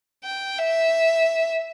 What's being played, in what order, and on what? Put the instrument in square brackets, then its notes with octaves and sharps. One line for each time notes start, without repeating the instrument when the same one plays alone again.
[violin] G5
E5